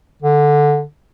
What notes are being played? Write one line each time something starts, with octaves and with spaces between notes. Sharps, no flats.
D3